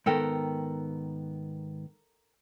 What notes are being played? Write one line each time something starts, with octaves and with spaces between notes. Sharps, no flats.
G#2 D#3 B3 A4 A#4 G5